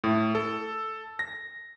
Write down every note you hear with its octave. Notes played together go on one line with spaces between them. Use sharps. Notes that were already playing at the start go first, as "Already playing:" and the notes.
A2
A4
A#6